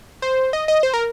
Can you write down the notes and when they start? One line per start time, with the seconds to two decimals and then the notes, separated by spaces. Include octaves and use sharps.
0.22 C5
0.53 D#5
0.68 D#5
0.83 C5
0.94 A#4